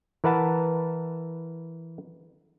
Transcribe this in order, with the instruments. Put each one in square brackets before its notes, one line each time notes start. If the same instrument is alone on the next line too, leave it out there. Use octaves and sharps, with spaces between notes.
[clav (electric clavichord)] E3 A#4 B4 F#5 A5